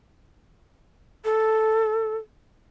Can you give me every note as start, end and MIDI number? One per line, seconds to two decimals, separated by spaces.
1.25 2.16 69